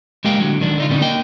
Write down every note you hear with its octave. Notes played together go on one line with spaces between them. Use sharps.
G#3 A#3 G4 A#4 F5 G5
D3 F#3
C#2 D#3 D4
D3 D#4 F4
D3 G3 A3 A#3 C#4 D#4
A#3 D#5 G5